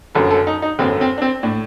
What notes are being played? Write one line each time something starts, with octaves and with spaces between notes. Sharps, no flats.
G1 F#2 D3 A4
A4
D#4
D#4
G1 F#2 D3 C4
C4
D4
C4
A2 D4